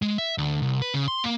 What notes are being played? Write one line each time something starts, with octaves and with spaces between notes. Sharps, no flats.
G#3
E5
D2
C2
B4
C#3
C6
A#3